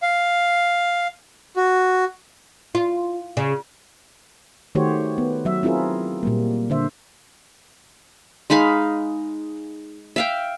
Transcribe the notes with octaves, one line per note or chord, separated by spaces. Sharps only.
F5
F#4
F4
C#3
D#3 A3 F#4 G4 C5 C#5
B3
F#3 E5
C4 E4 F4 G#4 A#4
A#2 G3 A#3
D3 C5 E5
G#3 D#4 F5 B5
E5 F5 G5